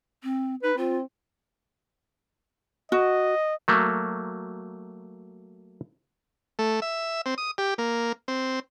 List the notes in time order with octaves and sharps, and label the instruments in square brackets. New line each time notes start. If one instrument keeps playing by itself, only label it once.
[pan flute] C4
[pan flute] D#4 [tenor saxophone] B4
[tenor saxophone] C4 [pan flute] F4
[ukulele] F#4 [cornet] D#5
[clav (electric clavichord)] F#3 A3 A#3
[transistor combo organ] A3
E5
C4
D#6
G4
A#3
C4